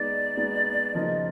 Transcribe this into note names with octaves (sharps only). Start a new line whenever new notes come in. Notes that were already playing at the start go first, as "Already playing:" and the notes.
Already playing: G#3 B3 D#4 D5
G#3 B3 D#4
C#3 F3 A#3 D#4 D#5